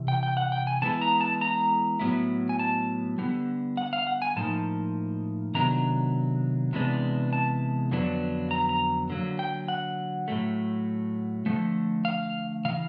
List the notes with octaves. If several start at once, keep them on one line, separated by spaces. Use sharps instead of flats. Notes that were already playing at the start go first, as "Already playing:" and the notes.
Already playing: C3 E3
G5
G5
F#5
G5
G#5
C3 E3 G#3 B3 E4 A5
A#5
A5
A#5
A2 F#3 B3 E4
G#5
A5
D3 G3 B3
F#5
F5
F#5
G#5
A2 F3 A#3 D#4 A5
C3 D#3 F#3 B3 D4 A#5
C3 E3 G#3 B3 D4
A5
F2 D3 F#3 B3 D4
A#5
A#5
D3 F#3 A#3
G5
F#5
A2 F#3 A3
D3 F3 A3
F5
C#3 E3 F5